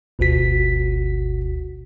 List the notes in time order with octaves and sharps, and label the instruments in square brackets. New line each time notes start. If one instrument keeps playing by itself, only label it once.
[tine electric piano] G1 D2 B2 F#4 B6